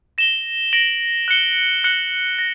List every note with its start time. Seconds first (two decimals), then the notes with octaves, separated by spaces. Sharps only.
0.18 A#6 E7 G7
0.73 A#6 D7 F#7
1.28 F#6 C#7 G7
1.84 F#6 C#7 F#7
2.39 A#6